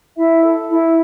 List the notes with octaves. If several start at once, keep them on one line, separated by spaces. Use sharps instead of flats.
E4 E5
A4
E4